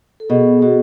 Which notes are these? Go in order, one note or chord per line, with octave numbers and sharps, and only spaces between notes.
A4
B2 G#4
B2 F#4